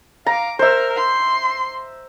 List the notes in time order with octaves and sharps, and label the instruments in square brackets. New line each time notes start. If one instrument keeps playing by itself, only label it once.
[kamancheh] F5 D6 [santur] A#5
[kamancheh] A#4 [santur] C5 E5
[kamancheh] C6